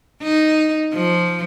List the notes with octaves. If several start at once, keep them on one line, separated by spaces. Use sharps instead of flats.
D#4
F3